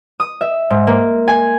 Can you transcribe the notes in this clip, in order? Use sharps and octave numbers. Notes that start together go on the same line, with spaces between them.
D#6
E5
G#2
A#3
G#5